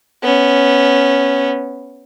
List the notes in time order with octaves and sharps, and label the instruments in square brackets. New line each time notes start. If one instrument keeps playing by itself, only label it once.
[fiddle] B3 C#4